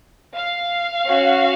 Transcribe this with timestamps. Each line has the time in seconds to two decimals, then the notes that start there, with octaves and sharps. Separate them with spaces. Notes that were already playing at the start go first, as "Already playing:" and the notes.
0.34 F5
1.05 C#4 F#4